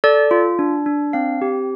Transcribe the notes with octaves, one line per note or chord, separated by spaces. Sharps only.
A4 D5
F4
D4
D4
C4 F5
G4